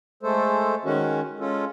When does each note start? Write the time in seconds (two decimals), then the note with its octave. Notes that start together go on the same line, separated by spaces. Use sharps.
0.23 G#3 A3 A4 C5
0.85 D#3 G#3 C#4 F#4
1.39 G#3 C#4 F4 A4